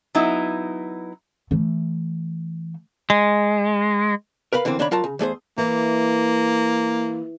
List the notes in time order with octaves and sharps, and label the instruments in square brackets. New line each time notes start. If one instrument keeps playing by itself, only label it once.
[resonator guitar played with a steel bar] F#3 B3 D#4 E4
[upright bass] E3 A3
[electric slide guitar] G#3
[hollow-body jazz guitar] A#4 B4 F5 B5
D3 E3 A#3 C4
D#3 A#3 D4 C#5 B5
F#3 F4 A#4 A5
C#3
E2 A3 G#4 C5
[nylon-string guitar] E3 [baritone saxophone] A#3